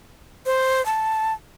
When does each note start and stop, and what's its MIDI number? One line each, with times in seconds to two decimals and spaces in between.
0.46 0.84 72
0.86 1.33 81